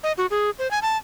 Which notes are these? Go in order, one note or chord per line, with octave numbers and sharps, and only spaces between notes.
D#5
F#4
G#4
C5
G#5
A5